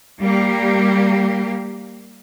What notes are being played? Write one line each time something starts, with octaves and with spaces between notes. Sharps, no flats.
G3 A#3 G4